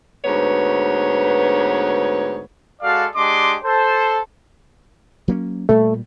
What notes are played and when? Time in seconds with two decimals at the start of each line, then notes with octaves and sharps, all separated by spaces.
0.24 D2 G#2 B3 B4 C#5
2.81 G#3 F#4 A4 D5 F5
3.16 G#3 D4 G4 D#5 C6 D6
3.64 A4 C5
5.28 F#3 A#3 C#4
5.69 A#2 G3 A3